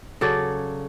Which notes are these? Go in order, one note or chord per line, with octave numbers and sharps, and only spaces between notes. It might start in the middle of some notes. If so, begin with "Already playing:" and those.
C#3 F#3 A4 D5